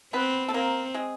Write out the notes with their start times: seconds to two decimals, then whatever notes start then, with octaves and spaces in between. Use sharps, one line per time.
0.13 B3 C4 B4
0.48 A4
0.54 A#3 C4 A#4
0.94 G#3 G#4